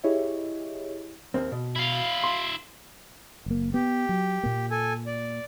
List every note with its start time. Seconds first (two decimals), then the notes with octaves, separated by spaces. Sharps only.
0.04 E4 G4 G#4 C#5 D#5 E5
1.34 D#2 A#3 C4
1.52 B2
1.76 E4 F5
2.24 C6
3.46 F#1 A#3
3.74 B3 G4
4.09 F#3
4.43 A#2 A#3
4.71 A4 G#5
5.06 D5